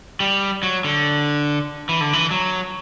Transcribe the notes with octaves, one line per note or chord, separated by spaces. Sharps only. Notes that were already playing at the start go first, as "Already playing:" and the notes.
G3
F#3
D3
E3
D3
E3
F#3